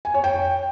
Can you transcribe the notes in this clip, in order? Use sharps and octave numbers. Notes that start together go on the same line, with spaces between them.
G#5
C#5
G5